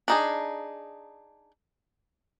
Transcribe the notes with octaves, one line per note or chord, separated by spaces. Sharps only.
D4 D#4 G#4